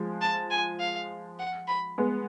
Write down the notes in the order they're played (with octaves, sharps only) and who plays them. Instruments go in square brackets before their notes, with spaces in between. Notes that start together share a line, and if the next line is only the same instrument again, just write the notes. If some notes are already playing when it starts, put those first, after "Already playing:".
Already playing: [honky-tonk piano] F3 G#3
[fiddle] A5
G#5
F5
F#5
B5
[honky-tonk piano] G#3 B3